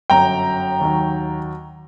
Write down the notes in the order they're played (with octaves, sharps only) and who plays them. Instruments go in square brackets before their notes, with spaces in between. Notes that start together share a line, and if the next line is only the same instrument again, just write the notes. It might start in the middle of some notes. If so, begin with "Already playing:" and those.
[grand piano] G1 F#2 F#3 G5 A#5
D#2 D#3 F#3